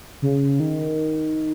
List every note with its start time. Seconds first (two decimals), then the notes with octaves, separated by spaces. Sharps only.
0.22 C#3
0.60 D#3